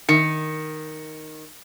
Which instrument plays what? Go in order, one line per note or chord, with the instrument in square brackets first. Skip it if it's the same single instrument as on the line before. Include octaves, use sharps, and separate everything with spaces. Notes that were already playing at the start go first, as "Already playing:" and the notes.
[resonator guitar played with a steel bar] D#3 [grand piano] C#7